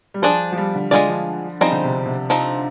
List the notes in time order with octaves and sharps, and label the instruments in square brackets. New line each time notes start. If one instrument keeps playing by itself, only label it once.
[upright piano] G3
[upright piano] F3 [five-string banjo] D4 G#4 C5
[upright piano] F3
G3
D3
[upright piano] D3 [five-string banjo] G#3 C4 F4 G#4 D5
[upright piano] F3
[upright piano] F3 [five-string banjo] G3 C4 D#4 G#4 C5
[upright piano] D3
C3
C3
[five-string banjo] F3 C4 D#4